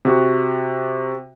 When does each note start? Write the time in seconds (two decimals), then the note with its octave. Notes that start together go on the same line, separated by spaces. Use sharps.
0.05 C3 F#4